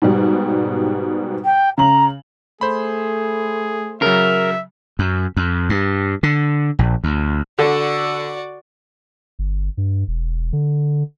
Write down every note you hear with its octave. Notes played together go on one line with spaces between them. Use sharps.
G#2 B2 G3
G5
C#3 A#5 F#7
A3 G#4 C5 B5
C#3 F#3 A#4 E5
F#2
F2
G2
D3
A#1
D2
D3 F#4 A4 D5
G1
G2
E1
D3